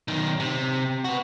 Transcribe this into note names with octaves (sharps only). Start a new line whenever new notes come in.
B1 D#3
C3
B3 F#4